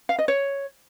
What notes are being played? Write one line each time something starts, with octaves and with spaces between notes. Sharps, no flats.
F5
D#5
C#5